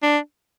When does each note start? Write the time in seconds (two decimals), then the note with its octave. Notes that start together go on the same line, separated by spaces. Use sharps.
0.03 D4